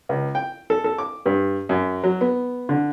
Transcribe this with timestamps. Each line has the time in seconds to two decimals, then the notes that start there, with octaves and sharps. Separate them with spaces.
0.09 C#2
0.35 G5
0.70 A4
0.84 A4
0.98 D6
1.26 G2
1.69 F#2
2.04 F#3
2.21 B3
2.69 D3